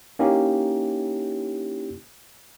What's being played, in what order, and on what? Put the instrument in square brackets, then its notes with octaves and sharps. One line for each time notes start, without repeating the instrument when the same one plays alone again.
[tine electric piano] A#3 C#4 D#4 E4 G4